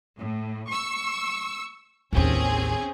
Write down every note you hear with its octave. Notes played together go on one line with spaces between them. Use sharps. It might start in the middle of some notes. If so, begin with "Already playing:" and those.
A2
C#6 E6
A1 D#2 C4 C#4 G#4